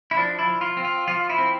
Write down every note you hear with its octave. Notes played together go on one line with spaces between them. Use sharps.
E4
F3 D4
E4
F3
F4
C4
F4
F3 F4
E4
C4